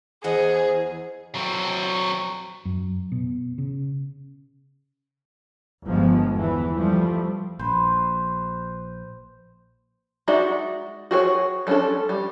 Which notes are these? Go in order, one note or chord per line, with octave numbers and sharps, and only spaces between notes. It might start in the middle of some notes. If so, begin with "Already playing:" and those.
E2 G#4 C5 D#5 F#5
F#3 C4
F#2
B2
C#3
G1 F3 G#3
E2 E3
F3 G3 A3
A#1 B4 C5
G#3 D#4 F#4 D5 E5
F#4 G#4 A4 C#5
G3 G#3 C#4 D4 A4
G3